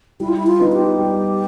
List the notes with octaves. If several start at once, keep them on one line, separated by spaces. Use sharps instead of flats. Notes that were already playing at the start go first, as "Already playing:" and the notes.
G3 E4
F4
E4
F4
B3 D#4
G4
G3